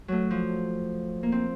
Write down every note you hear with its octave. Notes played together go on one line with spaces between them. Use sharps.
F#3 A3
F3
A#3
C4